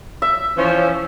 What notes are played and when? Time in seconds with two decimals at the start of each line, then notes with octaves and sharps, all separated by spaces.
0.22 E5
0.57 E3 F3 C#4